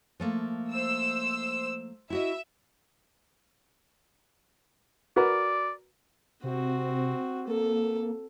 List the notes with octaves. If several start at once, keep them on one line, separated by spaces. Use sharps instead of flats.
F3 A3 A#3
C5 E6
E4 F#4 D#5 E5
F#4 A#4 B4 D5
C3 C4 F#4
A#3 A4